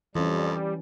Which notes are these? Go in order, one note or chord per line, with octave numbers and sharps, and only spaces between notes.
F2 E3 G3 C#4